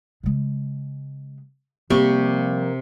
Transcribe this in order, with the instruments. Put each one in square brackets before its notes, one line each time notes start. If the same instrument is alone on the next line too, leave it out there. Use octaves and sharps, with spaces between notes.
[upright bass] C#3 G#3
[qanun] C3 C#6 [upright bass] F3 [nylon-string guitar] G3 [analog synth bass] A#3